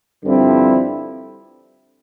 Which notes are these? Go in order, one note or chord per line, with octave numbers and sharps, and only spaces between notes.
G2 D3 F3 C4 E4